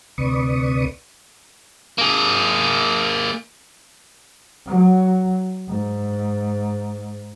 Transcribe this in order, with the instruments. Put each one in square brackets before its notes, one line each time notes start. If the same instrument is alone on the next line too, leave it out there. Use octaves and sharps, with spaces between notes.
[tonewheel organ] D2 C3 B4 D5 C#6 D#6
[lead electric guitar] A#3 G#4
[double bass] F#3
G#2